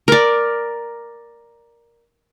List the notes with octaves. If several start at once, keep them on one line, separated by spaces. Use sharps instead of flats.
A#4 D5